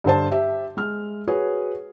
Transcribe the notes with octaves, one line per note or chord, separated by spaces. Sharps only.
G2 D3 C5 A5
G4 E5
G#3 F6
F#4 G#4 B4 C#5